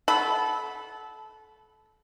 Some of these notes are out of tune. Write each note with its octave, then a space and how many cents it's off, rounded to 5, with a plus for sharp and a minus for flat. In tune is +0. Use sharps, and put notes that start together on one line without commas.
A4 -20 F#5 +0 B5 +0